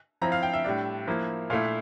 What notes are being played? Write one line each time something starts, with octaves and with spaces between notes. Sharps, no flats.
F3 C4 E4 A#5
F5
G5
E5
A2 G3 D4
F3 A#3 E4
A#2 A3 E4 F5